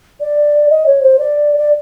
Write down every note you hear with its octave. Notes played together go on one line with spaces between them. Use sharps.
D5
D#5
C#5
C5
D5
D5